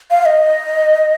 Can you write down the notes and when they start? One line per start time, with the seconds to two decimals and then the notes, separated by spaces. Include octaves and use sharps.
0.11 F5
0.22 F5
0.26 D#5